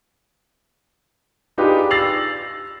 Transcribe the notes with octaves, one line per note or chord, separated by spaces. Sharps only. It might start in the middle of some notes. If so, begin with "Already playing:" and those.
D4 D#4 F4 G4 G#4 B4
E6 A6 A#6 C7 F7 F#7